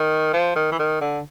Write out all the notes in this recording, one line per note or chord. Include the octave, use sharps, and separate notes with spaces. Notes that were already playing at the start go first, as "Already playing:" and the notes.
Already playing: D#3
F3
D#3
E3
D#3
D3